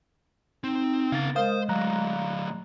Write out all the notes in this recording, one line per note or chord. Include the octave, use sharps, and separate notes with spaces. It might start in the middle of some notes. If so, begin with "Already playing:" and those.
C4 D#4
C#3 B3 F5 A6
G#3 A#4 C5 F5 D#6
F#3 A3 F5 A#5 F#6